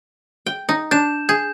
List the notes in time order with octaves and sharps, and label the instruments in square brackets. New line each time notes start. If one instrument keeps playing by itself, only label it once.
[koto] G5
D#4
[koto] D4 [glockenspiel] G6 E7
[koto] G#4 [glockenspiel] G6